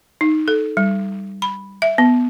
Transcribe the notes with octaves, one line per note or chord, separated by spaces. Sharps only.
D#4
A4
G3
B5
E5
B3